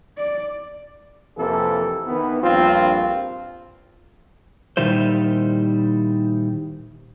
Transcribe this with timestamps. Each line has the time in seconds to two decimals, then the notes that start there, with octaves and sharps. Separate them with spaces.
0.17 D5
1.37 F2 C3 E3 A#3 A4
2.07 D#3 E3 B3
2.42 A#1 G2 C4 F4
4.77 A#2 D#3 G3 E4 C5